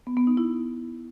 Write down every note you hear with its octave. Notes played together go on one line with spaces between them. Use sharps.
B3
B3
D#4
E4